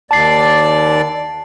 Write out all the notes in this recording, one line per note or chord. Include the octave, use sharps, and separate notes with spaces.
D#2 D5 A5 C7